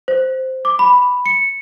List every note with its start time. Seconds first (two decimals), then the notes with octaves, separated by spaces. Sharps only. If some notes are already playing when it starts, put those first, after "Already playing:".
0.08 C5
0.65 D6
0.79 B5
1.26 C#7